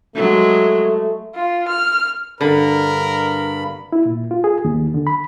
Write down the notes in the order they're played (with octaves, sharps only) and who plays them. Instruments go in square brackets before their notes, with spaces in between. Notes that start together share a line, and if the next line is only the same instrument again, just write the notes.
[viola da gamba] F#3 G#3 [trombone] A3
[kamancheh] F4
F6
[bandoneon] G2 B5 [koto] D3 [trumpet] A#4
[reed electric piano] E4
A#2
F4
G#4
D#2
D3
B5